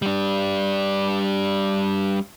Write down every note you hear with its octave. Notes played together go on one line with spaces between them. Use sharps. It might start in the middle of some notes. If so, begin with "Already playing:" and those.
G3 D4